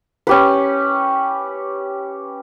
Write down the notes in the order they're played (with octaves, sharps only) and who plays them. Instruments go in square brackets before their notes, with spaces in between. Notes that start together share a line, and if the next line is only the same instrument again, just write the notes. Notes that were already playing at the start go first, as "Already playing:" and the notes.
[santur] C#4 G4 B4